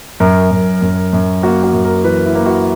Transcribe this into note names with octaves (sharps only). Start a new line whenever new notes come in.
F#2 A#4
F#2
F#2
F#2
A#3 F#4
F#4
F#2
A#4
A#4
E3 B4
E4
A#3
F#4